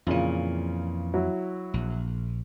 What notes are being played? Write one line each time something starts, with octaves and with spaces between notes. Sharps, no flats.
F2 A#2 C#3 E3 F4
F#3 E4 F#4
A#1